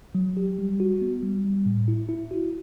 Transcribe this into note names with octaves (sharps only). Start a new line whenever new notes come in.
F#3
G4
G3
F#4
B3
G3
G3
A2
E4
E4
F#4